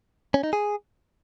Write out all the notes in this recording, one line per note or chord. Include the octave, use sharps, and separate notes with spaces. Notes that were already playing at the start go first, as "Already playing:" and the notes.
C#4
D#4
G#4